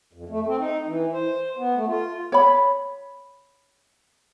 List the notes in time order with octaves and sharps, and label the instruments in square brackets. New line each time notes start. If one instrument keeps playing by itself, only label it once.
[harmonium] F2
A3
C4
D#4
E3
C5
B3
A3
F4
[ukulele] C#5 B5